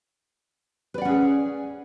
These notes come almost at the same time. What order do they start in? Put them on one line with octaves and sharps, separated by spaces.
B4 D5 F#5 C#4 G#4